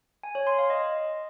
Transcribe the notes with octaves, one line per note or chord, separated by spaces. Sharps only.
G#5
C#5
C6
F5
D#5